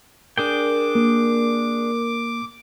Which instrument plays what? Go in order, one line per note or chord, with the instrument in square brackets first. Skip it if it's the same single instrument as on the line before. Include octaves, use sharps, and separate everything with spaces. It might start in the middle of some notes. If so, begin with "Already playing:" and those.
[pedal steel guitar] D4 G#4 G5 [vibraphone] A#4 [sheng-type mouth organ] D6
[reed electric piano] A#3